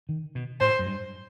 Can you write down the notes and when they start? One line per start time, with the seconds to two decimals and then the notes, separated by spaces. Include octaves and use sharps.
0.09 D#3
0.35 B2
0.61 A2 C5
0.79 F#2
0.87 G2